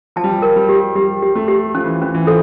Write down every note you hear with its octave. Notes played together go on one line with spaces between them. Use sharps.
F3 A5
G3
F3
A#4
G3
G4
G3 G4
G4
A3
G4
F3 C#4
E3
E3 C#4
E3
F3 A4